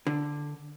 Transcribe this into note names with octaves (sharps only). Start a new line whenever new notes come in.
D3